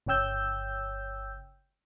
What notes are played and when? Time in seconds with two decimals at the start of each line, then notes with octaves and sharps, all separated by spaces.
0.06 G1 C#3 C#5 G5 E6 G6